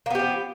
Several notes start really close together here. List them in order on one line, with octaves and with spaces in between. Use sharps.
A#3 B3 G4 F3